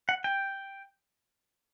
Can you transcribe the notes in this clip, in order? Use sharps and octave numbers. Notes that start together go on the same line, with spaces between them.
F#5
G5